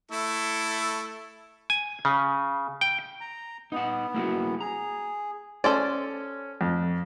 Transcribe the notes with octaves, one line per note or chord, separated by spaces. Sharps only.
A3 E4 A4
G#5
C#3
G5
A#5
B3 D#4 F#5
A#3 E4 F#4
G#4 A#5
C#4 A4 C5 D5
F2